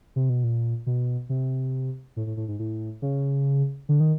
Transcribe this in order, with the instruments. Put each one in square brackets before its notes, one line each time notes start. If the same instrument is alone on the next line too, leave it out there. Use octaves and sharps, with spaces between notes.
[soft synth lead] C3
B2
A#2
B2
C3
A2
A2
A2
G#2
A2
C#3
D3
D#3